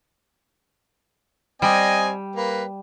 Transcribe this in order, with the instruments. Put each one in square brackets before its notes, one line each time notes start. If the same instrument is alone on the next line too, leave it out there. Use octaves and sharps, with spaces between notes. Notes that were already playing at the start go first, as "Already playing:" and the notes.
[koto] G3 [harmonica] C4 D#5 G#5
[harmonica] A#3 B4